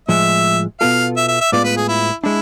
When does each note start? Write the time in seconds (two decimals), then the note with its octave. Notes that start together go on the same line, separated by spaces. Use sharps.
0.09 A2 F3 G#3 E5
0.80 B2 B3 F4 A4 F5
1.17 E5
1.28 E5
1.41 E5
1.52 A2 G#3 B3 F4 D5
1.64 B4
1.77 G#4
1.88 E4
2.24 G#3 D4 E4